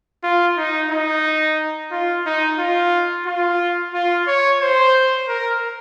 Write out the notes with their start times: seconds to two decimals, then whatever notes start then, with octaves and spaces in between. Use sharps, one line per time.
0.24 F4
0.57 D#4
0.91 D#4
1.92 F4
2.26 D#4
2.59 F4
3.26 F4
3.94 F4
4.27 C#5
4.61 C5
5.28 A#4